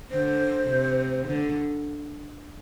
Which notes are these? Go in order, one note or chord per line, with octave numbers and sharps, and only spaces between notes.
D3 C5
C3
D3